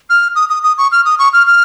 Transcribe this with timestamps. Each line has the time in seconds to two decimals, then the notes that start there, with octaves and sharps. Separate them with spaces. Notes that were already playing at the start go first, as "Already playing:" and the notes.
0.10 F6
0.35 D#6
0.50 D#6
0.63 D#6
0.78 C#6
0.92 F6
1.05 D#6
1.19 C#6
1.33 F6
1.47 F6